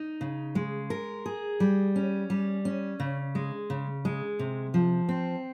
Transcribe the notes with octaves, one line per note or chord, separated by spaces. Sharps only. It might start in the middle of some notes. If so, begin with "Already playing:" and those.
Already playing: D#4
C#3
G#3
A#4
G#4
G3
C#4
G3
C#4
C#3
G#3
C#3
G#3
C3
F3
C4